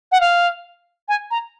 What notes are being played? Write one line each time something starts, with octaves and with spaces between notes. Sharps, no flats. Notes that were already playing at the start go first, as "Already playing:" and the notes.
F#5
F5
G#5
A#5